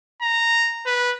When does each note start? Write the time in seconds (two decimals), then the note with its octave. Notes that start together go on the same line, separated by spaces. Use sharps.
0.22 A#5
0.86 B4